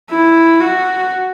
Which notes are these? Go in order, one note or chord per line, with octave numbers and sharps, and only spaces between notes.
E4
F#4